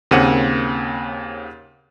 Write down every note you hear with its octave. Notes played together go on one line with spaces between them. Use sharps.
D#2 C#3 A#3 C4 F#5 D#7